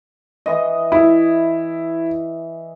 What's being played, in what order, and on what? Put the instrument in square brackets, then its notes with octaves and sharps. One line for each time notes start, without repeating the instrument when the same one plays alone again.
[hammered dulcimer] E3 D#5
[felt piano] E4